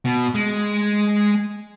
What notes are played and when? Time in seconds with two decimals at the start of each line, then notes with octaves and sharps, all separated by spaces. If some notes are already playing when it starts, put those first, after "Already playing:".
0.05 B2
0.35 G#3